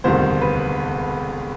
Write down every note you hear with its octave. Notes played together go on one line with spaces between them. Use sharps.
E1 D2 C3 D#3 G3 C5
B4